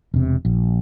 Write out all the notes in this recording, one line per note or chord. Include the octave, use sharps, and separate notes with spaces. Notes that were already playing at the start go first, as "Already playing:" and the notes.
E1 C3
A#1